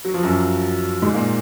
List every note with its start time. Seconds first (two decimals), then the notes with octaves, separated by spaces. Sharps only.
0.05 F#3
0.14 F3
0.23 F#2 F#3
1.02 G#2 G#3
1.14 A#2 A#3